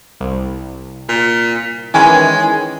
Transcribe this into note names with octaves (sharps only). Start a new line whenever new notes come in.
C2
A#2
D#3 E3 G#3 C#4